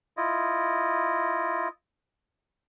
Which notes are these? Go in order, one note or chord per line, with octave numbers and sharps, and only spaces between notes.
E4 F4 D#5